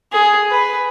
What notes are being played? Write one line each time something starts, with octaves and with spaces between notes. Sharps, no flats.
G#4
B4